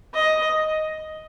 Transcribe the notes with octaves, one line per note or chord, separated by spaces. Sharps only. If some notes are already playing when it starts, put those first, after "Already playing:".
D#5